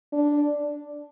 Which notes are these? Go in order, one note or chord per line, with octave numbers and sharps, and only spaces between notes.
D4